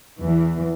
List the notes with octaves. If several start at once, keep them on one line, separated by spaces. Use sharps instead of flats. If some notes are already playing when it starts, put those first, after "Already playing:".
E2 E3